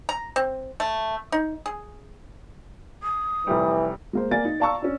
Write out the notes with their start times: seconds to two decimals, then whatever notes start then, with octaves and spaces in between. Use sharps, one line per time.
0.09 A#5
0.36 C4
0.80 A3
1.32 D#4
1.66 G#4
3.03 D#6
3.47 F1 E3 G3
4.13 G#3 A#3 C5
4.31 A#3 D5 G#5 A6
4.45 D#4
4.60 D5 F5 A5 A#5 C#6 E6
4.82 C#4 D4